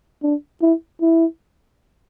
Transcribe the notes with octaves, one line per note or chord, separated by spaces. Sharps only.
D4
E4
E4